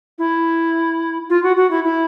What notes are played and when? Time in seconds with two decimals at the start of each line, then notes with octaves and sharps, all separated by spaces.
0.18 E4
1.30 F4
1.43 F#4
1.56 F#4
1.71 E4
1.84 E4